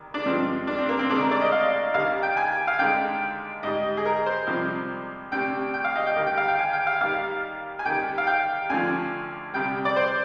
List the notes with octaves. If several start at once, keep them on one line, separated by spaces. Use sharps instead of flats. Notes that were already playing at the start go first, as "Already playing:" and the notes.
Already playing: C2 D#3
D4
G2 F3 G#3 C4
D4
C4
A#3
C4
D2 D3 G#3 D4
A#4
D5
D#5
F5
D#2 D#3 G3 F5
G5
G#5
F5
D#2 D3 G#3 G5
G#2 G3 D#5
G#4
A#4
C5
C2 C3 F3
D2 C3 G3 G5
G5
F5
D#5
G5
D#2 D#3 G3
G5
F5
G5
G#5
G5
F5
D#2 D#3 G3 F5
G#5
D#2 D#3 G3 G5
F5
G5
D2 D3 F3 G#5
C2 C3 G3 G5
D5
C5